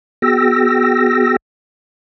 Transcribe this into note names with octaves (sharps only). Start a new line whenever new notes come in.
B3 F#4 G#4 G5 E6 A#6